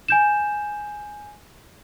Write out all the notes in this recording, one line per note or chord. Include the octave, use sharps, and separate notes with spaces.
G#5 G6 E7